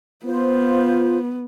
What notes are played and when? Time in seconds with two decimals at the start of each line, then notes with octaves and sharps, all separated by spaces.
0.25 B3 F4 C5